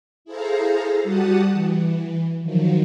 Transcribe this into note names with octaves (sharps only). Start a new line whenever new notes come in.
E4 G#4 A4 C5 F5 A#5
G3 F#4 G4 F#5 A5 D#6
E3
D#3 F3 F#3